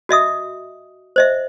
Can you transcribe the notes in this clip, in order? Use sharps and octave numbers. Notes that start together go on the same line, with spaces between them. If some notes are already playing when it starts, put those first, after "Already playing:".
F#4 D#5 E5 D#6
C5 D#5 E5